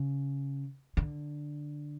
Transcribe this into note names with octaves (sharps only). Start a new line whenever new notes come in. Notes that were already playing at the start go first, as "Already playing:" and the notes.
Already playing: C#3
D3